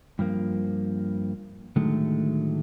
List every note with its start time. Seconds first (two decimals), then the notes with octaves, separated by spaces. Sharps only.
0.19 G2 F3 A#3
1.76 A2 D3 D#3 F#3 G#3 A3